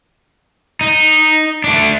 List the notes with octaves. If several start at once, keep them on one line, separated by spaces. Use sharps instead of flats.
D#4
A3 D4